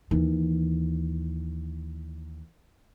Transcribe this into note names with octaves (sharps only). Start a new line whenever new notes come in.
D#2 E3